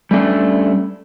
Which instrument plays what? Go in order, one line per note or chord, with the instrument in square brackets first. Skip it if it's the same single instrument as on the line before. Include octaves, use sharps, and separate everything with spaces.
[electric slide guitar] G3 A3 C#4 D4